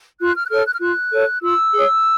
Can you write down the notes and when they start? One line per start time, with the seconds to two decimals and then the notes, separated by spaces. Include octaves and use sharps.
0.19 F4 F#6
0.34 F6
0.44 F#6
0.49 A4 C#5 F6
0.65 F#6
0.72 F6
0.80 F4 F#6
1.12 A4 C#5
1.42 F4 E6
1.73 G#4 C#5